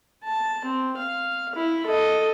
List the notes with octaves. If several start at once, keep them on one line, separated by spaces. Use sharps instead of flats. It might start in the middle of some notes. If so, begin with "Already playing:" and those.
A5
C4
F5
E4
A4 D#5